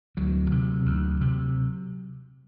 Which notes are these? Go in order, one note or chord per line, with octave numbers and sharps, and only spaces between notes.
D2 F#3
C3
D2
C3